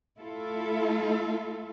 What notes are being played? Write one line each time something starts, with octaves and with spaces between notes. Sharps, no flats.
A3 E4 F4 A4